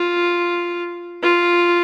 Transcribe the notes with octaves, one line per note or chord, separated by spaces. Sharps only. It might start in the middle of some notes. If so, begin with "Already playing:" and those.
Already playing: F4
F4